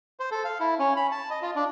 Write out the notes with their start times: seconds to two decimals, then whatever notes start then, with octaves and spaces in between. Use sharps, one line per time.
0.20 C5
0.31 A4
0.45 F5
0.60 E4
0.79 C#4
0.97 B5
1.11 A5
1.30 D#5
1.42 F4
1.56 D4